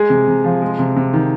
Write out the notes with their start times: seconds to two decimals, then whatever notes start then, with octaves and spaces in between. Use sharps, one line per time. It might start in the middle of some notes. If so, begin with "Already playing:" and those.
Already playing: G#3 G#4
0.10 C3
0.28 C3
0.44 F3
0.62 G#3
0.79 C3
0.96 C3
1.13 D#3